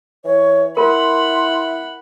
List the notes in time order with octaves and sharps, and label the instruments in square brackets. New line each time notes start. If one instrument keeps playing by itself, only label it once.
[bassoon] E3 [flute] C#5
[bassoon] E4 [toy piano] F4 A#4 [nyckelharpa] F#5 B5 [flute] C6